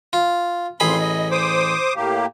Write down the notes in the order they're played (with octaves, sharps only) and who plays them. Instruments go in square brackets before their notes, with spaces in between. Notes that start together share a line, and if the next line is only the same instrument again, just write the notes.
[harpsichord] F4
[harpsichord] A1 G#4 B5 [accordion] F2 C6
[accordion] D#5
C5 D6 D#6
A2 A#3 G4